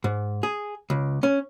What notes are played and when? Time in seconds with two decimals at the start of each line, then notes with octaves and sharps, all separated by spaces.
0.04 G#2
0.43 G#4
0.90 C#2
1.23 C#4